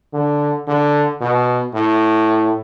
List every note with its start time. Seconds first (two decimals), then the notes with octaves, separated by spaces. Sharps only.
0.13 D3
0.67 D3
1.21 B2
1.74 A2